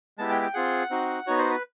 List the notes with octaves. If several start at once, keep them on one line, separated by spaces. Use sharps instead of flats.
G#3 B3 E4 G4 A5
G5
G5
C4 F4 G#4 F#5
C4 D#4 F#4
B3 D#4 F#4 C#5
C5
B4